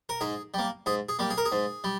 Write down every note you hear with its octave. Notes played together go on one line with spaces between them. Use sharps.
A#4
G#2 G#4
G3 A#3
G#2 G#4
G#4
G3 A#3
G#4
A#4
G#4
G#2
G3